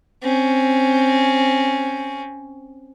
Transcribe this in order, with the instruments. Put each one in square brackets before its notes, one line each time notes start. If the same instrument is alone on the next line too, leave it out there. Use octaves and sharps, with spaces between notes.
[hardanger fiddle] C4 C#4